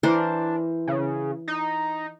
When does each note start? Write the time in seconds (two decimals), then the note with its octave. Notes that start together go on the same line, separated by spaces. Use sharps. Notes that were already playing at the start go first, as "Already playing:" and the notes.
0.03 E3 D4 A#4 C5
0.87 C#3
1.48 D#4